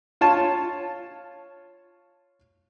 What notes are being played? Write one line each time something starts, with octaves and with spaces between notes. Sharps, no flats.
F4 C#5 A5